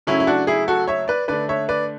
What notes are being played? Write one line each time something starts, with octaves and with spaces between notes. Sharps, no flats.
C#3 F#3 A3 C#4 E4
E4
D4 F#4
E4 G#4
F#4 A4
C#5 E5
B4 D5
D3 A3 B4 D5
C#5 E5
B4 D5